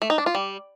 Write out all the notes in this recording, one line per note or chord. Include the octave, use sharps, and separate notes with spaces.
A3
D#4
D4
F4
G3